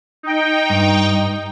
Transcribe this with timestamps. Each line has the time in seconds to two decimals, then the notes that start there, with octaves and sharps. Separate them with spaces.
0.23 D#4 G5
0.70 G2